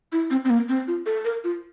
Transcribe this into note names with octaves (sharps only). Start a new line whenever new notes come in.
E4
C4
C4
A#3
C4
F4
A4
A#4
F4